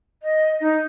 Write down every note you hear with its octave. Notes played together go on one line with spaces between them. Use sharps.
D#5
D#4